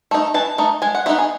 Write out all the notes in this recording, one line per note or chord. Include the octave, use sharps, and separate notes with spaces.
A3 D#4
E3 A5
A3 D#4
G#3 G#5
F#5
B3 D#4 E5
G#4